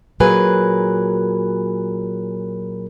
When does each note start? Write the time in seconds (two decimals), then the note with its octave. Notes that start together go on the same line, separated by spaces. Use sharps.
0.20 A#2 F#3 G#4 A#4 B4 G#5